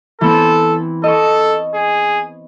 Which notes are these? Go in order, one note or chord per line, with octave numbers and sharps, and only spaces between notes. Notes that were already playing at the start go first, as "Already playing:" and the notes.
E3 B3 C4 A4
A4 D#5 C#6
G#4